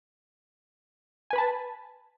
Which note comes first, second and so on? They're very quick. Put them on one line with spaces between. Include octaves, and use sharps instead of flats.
G#5 B4 B5 A5